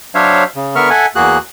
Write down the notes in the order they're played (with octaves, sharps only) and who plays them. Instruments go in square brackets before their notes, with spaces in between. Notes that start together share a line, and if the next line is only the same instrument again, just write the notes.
[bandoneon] F#3 D4 C5 C#5 E5 F5
C#3
D3 B3 A#4 E5 C#6 F6
A4 E5 F#5 G#5
E2 A#3 F#4 G#4 F#6